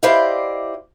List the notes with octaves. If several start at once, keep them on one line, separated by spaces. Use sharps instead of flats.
E4 G4 C5 D5 D#5 F5